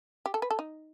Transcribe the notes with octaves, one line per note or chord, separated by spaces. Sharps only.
G4
A4
B4
A4
D#4